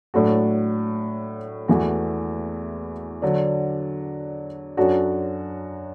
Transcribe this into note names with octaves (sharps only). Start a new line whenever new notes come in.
A2 F#3 D4 F#4 A4
E2 E3 A3 F#4
D3 F#3 D4
F#2 F#3 D4 F#4 A4